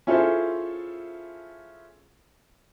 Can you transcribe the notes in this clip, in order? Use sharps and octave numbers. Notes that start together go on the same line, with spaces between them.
C#4 E4 F4 G#4 A4 C5